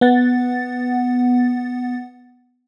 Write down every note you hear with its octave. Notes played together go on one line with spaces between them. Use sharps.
B3 F#5 A6